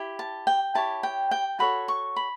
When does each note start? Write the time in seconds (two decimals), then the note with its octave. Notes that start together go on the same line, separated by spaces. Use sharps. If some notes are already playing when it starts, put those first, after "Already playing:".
Already playing: E4 G4
0.19 A5
0.47 G5
0.75 E4 G4 C#5 A5
1.03 G5
1.31 G5
1.59 F#4 A4 C#5 B5
1.88 C#6
2.16 B5